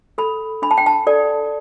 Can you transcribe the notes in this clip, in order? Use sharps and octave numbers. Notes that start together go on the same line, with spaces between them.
A4 B5
D4 B5
A5
G5
A5
A4 D5